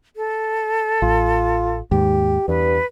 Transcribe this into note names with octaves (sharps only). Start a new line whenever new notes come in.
A4
A1 F4
D#2 G#2 G4
E2 G2 B4